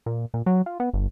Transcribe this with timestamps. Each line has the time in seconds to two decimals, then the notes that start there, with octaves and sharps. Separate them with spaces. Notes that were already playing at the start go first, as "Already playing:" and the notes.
0.06 A#2
0.34 A#2
0.46 F#3
0.66 F4
0.80 B3
0.94 G1